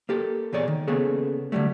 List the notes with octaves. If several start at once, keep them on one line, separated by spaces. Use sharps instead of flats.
A#3 G4 A4
E2 A#2 G#4 C#5 D5
D#3
C#3 A#3 B3 G#4 A4 C#5
D3 D#3 F#3 G3 A3